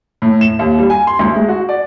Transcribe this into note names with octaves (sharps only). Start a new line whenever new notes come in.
A2
E7
D#2
G3
G#5
C6
D2
G#3
F#4
D5